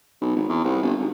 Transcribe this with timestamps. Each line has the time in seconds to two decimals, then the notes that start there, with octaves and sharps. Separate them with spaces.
0.21 B1
0.36 G#1
0.49 E2
0.64 C2
0.83 G1
0.99 G#1